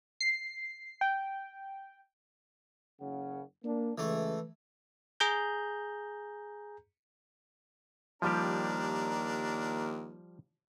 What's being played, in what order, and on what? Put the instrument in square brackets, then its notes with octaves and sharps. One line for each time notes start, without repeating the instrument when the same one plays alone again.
[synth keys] C7
G5
[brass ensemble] F#1 C#3 F#5
A#3 D4
[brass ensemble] C#2 [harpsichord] E3 A3
[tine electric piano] G#4 A#5 G6
[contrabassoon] D#2 [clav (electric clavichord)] F3 G3 G4 [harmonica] D4 A#4